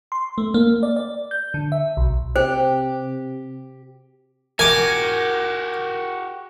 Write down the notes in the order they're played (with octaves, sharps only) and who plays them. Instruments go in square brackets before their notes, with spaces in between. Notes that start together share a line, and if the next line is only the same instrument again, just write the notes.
[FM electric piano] C6
A3
A#3
D5
D5
G6
D3
E5
B1
[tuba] C3 [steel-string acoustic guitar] G4 [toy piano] C5
[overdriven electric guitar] F#4 G4 [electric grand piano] A#4 [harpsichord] G#5 D6